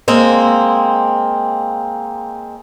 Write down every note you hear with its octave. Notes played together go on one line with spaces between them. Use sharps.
G#3 A#3 C4